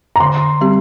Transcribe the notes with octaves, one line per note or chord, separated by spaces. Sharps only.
A#5
D3 C6
G3 C4 G4